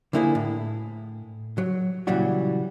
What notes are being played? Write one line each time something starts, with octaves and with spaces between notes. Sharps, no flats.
D3 F3 A#3 E4 F4 G#4
A2
F#3
A#2 C#3 E3 F#3 G3 F#4